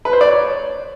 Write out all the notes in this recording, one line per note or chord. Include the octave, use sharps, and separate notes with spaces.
B4
C5
D5
C#5